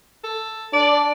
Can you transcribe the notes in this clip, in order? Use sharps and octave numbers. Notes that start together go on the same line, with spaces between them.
A4
D4 D5